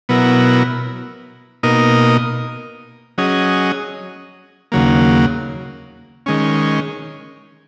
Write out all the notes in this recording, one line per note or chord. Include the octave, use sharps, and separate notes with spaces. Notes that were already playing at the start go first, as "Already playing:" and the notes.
B2 F#3 B3 E4 A#4
B2 A#3 D#4 A#4 D#5
F#3 C#4 G#4 D#5
D#2 C#3 F#3 A#3
D#3 G#3 C#4